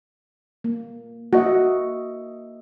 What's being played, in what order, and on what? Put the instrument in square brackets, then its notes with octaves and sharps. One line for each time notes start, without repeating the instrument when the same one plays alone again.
[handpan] A#3
[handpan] A#3 D#5 E5 [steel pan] F#4